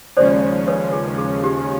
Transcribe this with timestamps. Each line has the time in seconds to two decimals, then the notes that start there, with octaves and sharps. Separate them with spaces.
0.17 D#2 C#3 F3 G#3 C#4 C5 D5
0.67 B4 C#5
0.93 G#4
1.18 G#4
1.44 G4